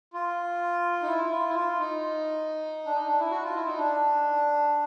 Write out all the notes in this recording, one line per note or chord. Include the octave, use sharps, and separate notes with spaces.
F4
D#4
E4
F4
E4
F4
D#4
D4
D#4
D4
E4
F#4
F4
E4
D#4
D4